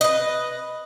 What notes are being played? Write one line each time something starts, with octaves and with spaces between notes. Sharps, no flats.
B4 D#5